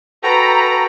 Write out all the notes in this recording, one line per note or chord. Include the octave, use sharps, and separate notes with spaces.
F#4 A4 B4 G5 A#5